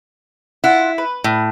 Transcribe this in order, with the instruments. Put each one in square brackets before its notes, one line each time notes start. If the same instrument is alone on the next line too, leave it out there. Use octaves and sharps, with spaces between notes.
[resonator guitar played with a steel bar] E4 [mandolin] F4 F#5
[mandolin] B4
[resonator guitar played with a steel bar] A2